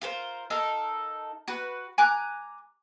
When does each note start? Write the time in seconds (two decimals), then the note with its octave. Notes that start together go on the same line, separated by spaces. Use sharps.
0.02 F4 A#4 C5
0.50 D#4 A4 A#4 F5
1.48 F#4 B4
1.98 G#5 A#5 D6 F#6